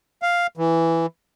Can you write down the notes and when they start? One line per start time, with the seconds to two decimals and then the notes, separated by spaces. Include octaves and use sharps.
0.22 F5
0.57 E3